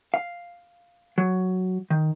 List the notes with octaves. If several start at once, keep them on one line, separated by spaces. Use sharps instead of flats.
F5
F#3
D#3